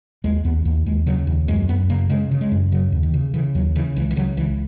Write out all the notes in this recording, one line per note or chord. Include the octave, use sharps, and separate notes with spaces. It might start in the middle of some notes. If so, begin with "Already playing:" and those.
D#2 G#3
D#2 B3
D#2 A#3
D#2 G#3
C#3 F#3
D#2
F#2 G#3
F#2 B3
C#3 A#3
C#3 G#3
C#3
G#3
F#2
C#3 F#3
D#2
D#3
C#3
C#3 E3
D#2 F#3
C#3 E3
C#2 E3
E3
C#3 F#3
C#2 E3